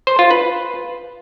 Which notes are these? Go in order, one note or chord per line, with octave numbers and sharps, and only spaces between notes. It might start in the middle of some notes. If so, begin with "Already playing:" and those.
C5
F4
B4